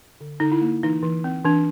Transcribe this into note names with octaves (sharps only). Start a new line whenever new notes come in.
D3
D3 D#4
E4
A#3
E3 D#4
E3
C4
E3 D4